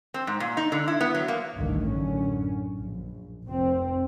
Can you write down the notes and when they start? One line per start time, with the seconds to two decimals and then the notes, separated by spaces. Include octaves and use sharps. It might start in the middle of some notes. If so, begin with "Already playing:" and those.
0.14 C4
0.27 G#2
0.40 A#2
0.57 D#4
0.72 D3
0.88 E4
1.01 B3
1.14 F#3
1.28 A#3
1.55 A1 D2 G2 D#3 A3
1.90 F#2 A2 D3 C#4
2.76 A#1
3.45 F1 C4